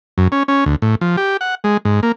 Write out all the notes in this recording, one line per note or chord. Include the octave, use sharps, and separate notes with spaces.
F#2
C#4
C#4
D2
A2
F3
G4
F#5
G#3
G#2
A#3